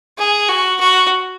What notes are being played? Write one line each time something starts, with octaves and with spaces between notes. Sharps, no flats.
G#4
F#4
F#4